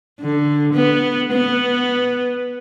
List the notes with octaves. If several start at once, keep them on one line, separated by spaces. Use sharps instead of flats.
D3
B3
B3